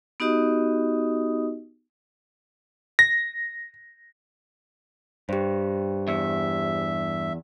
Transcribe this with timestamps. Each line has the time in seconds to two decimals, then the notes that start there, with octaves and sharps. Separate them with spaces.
0.20 B3 D#4 F#4 G4 D#5 D#6
2.99 A#6
5.29 G2 G4 C5
6.08 E2 E5